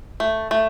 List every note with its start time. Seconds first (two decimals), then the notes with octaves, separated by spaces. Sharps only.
0.20 A3
0.51 A3